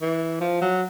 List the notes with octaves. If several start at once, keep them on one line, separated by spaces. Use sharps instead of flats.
E3
F3
F#3